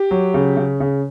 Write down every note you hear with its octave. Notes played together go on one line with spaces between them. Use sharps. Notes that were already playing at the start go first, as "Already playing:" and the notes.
Already playing: G4
F#3
C#3
C#3
C#3